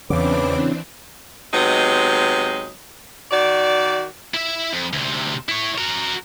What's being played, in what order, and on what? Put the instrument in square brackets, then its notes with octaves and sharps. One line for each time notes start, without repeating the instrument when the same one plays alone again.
[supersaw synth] E2 D6 [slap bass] C#3 [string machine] E3 C4 D4 [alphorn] B4
[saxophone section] C3 F#3 G#3 B3 D#4
D#3 F#4 D5
[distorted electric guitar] E4 E5
F2
D2 C3
E4 C#5
F#4 A#4